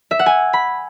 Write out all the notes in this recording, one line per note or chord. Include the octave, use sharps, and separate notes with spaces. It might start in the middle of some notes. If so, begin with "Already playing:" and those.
E5
F#5
G#5
B5